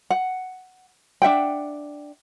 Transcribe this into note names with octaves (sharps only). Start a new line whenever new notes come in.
F#5
D4 E5 F#5 G5